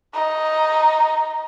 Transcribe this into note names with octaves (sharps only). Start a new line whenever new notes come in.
D#4